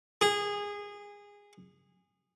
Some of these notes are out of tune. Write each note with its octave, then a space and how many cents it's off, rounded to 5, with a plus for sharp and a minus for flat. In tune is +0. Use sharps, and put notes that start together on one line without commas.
G#4 -20